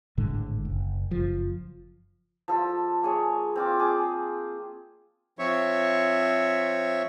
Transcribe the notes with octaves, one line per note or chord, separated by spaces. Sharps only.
G#1 A2 D3 G#3
F#1
F#1 F3
F3 A4 C6
A#3 G#4 C#5
C4 F4 D6
G#4 D6
F3 C4 C#5 E5 C#6